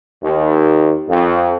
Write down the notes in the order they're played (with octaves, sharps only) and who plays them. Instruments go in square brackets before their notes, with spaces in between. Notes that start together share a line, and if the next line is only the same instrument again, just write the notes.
[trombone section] D#2
F2